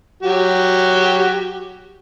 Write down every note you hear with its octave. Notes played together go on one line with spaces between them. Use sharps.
F#3 F#4 G4